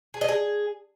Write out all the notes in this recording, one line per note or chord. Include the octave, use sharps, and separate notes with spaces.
G#4
D#5
G#4